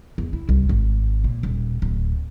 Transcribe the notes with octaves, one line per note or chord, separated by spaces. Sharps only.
E2
E4
C2
G#1
A#2
D#1
D1